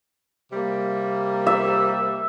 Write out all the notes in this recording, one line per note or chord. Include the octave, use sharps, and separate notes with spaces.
C3 G3 A#3
E5